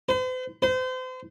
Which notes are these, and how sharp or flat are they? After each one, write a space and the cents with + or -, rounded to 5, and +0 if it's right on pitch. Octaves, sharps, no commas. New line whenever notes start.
C5 -45
C5 -35